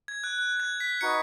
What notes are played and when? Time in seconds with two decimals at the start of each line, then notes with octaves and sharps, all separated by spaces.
0.08 G#6
0.24 F#6
0.39 F#6
0.60 G#6
0.80 B6
1.01 D#4 F#4 B4 D#5 C#7